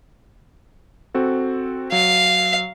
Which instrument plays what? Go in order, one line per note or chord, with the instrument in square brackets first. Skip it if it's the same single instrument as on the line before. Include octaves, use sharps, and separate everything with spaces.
[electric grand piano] C4 F#4 A4
[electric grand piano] F#3 [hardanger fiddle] F5